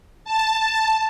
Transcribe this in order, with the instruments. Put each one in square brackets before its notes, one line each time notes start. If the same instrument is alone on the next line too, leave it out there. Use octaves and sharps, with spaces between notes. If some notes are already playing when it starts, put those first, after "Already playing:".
[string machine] A5